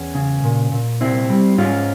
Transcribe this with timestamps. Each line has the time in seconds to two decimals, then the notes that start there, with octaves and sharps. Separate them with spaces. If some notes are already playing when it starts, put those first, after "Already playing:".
Already playing: E2 C#4
0.15 C#3
0.44 A#2
0.72 A#2
1.01 C3 C4 E4
1.30 G3
1.58 G#2 C#4 F4